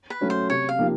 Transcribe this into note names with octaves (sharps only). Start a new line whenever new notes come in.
B4
F#3 A3 C#4 F#4
C5
C3 C#5
F5
F3 A#3 D#4 G4